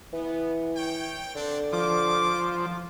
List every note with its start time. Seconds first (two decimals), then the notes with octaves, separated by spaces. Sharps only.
0.13 E3 B3
0.76 C#5 G5
1.36 D3 C4 D4
1.73 F3 D6